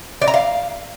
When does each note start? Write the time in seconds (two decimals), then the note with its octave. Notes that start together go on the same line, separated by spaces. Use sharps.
0.22 D5
0.28 A#5
0.34 F5